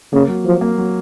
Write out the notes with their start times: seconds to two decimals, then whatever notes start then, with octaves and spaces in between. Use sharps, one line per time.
0.12 C#3 A#3
0.28 F#3
0.45 F3 F#3
0.61 A#3
0.78 F#3